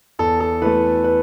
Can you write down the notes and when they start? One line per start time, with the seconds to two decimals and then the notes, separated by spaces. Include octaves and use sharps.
0.19 E2 A4
0.40 A4
0.62 E3 A3 B4
1.04 B4